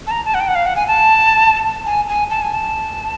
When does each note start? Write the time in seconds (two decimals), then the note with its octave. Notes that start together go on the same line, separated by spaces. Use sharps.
0.07 A5
0.11 A#5
0.25 A5
0.34 F#5
0.40 G5
0.48 F#5
0.55 F5
0.66 F#5
0.76 G#5
0.88 A5
1.86 G#5
2.09 G#5
2.30 A5
2.42 G#5
2.54 A5